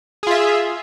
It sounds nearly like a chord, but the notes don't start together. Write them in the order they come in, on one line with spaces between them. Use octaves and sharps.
G#4 F4 E5